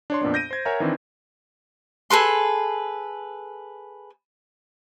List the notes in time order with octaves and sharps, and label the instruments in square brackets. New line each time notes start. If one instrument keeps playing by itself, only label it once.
[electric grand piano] D4 C#5 C6
F2 A#2 B3 D4
G6 A#6 D7 D#7
C5 G#6
A#4 C#5 E5 F#5 G#5 A#5
D#3 E3 C4 D4
[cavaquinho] G#4 A4 B4 C6